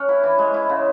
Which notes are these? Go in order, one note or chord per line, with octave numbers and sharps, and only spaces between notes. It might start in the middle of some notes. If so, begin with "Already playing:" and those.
Already playing: C#4 F#5
E4 B5
E3
G#3
E4
C#3